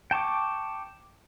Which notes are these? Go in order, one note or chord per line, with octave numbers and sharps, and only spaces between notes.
G5 A5 C#6 D6